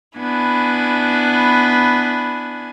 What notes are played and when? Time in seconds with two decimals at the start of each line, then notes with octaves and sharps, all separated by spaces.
0.18 B3 D4 E4 G#5